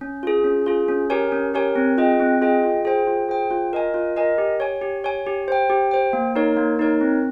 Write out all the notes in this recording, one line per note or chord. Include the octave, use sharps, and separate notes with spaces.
C#4
F4 G#4
C#4
F4 G#4
C#4
G4 A#4 C#5 G#5
C#4
G4 A#4 C#5 G#5
C4
F4 G#4 D#5 G5
C4
F4 G#4 D#5 G5
F4
G#4 C5 G5
F4
G#4 C5 G5
F4
A#4 D#5 G#5
F4
A#4 D#5 G#5
G4
C#5 G#5
G4
C#5 G#5
G4
C5 G5
G4
C5 G5
A#3
D#4 A#4 C#5
A#3
D#4 A#4 C#5
C4